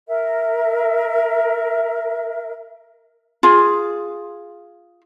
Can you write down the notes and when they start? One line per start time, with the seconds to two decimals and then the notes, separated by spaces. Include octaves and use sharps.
0.08 A#4 E5
3.43 F4 G#4